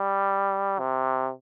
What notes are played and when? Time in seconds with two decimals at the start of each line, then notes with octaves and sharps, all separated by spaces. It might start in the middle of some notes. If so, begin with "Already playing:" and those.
Already playing: G3
0.79 C3